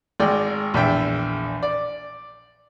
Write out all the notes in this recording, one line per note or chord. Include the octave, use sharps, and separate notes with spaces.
G#1 G#3 D5 G5
A#1 E2 E5 G5
D5